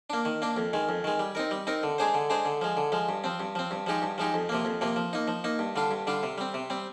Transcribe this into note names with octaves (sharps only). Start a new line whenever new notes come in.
A#3 D4
D#3
A#3 D4
F2
D#3 G#3
F2
D#3 G#3
G3
C4 D#4 A#4
G3
C4 D#4 A#4
D3
G#3 D4 G#4 C5
D3
G#3 D4 G#4 C5
D3
F3 G#3
D3
F3 G#3
G2
F3 C4
G2
F3 C4
G2
F3 G#3 D#4 G4
G2
F3 G#3 D#4 G4
F2
C3 F3 A#3
F2
C3 F3 A#3
F3
A#3 D#4
F3
A#3 D#4
G2
D3 G3 D4 F4
G2
D3 G3 D4 F4
C3
G3 C4
C3
G3 C4